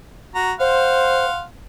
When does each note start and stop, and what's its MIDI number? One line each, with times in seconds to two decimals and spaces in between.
0.35 0.52 66
0.35 0.52 82
0.60 1.26 72
0.60 1.43 77
0.60 1.43 78
0.60 1.43 84